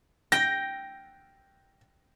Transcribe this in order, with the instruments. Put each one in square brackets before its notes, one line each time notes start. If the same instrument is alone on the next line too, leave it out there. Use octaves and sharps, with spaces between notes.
[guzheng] G5 [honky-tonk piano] A#6